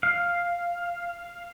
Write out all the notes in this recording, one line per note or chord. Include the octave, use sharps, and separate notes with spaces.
F5